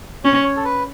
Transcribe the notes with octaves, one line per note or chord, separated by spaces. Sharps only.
C#4 C#5
C#5
A4
B4